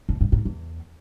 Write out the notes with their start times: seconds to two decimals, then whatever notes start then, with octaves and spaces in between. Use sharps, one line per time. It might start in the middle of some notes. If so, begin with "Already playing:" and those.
0.09 F2
0.21 G2
0.32 G#2
0.45 E2